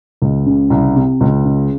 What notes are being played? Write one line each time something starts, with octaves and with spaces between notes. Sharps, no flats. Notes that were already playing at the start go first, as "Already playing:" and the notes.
C#2
C#3
C2
C3
C#2
C#3